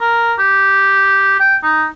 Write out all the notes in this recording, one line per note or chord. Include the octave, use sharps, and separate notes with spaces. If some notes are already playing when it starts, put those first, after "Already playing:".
A#4
G4
G5
D#4